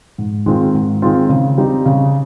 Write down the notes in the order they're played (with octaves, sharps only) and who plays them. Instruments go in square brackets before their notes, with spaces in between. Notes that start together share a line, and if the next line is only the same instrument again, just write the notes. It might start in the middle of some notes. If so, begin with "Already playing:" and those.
[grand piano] G#2
D#3 G#3 C4 F4
G#2
D#3 G#3 C4 F4
C#3
G3 C4 D#4
C#3